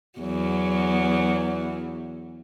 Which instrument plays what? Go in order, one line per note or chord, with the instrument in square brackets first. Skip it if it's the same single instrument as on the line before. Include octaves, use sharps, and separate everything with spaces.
[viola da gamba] E2 F#3